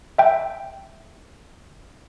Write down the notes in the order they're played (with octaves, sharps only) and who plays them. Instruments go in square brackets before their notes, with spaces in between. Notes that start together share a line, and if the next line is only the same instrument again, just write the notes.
[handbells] E5 G5